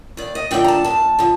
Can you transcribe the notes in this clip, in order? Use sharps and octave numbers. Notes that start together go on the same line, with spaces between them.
D#2 D5
D#5
D3 F3 A#3 D4 G5
A#5
A5
D#2 A5
D3 F3